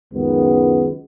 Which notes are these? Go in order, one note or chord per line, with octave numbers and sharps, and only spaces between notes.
C#2 F#2 D#3 G#3 B3